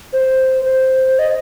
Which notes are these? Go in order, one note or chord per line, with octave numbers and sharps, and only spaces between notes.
C5
C5
D#5